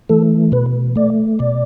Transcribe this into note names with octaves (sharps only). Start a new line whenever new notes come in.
E3 A3 A4
B2 B4
A3 D5
B2 D5